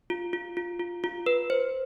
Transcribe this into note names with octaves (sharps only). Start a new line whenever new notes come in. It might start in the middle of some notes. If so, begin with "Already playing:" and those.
F4
F4
F4
F4
F4
B4
C5